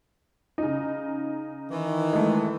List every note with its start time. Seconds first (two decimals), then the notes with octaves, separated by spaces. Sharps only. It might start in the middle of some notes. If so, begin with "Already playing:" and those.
0.58 C#3 D#4
1.70 D#3 E3
2.13 G#3 A3